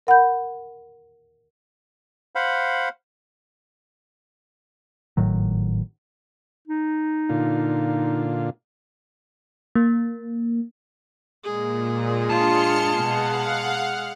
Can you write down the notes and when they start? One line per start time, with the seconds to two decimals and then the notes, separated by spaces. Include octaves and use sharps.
0.07 A#4 F#5 B5 G6
2.35 C5 F5 F#5 B5
5.17 G#1 A2 D#3 F#3
6.68 D#4
7.29 A#2 D3 F4
9.75 A#3
11.45 A#2 G#3 G#4
12.30 D4 F4 A5 C6 F6 C#7
12.95 B2 F5 F#5